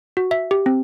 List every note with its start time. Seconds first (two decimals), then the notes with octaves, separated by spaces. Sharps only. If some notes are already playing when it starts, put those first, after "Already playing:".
0.17 F#4
0.31 E5
0.51 G4
0.66 C4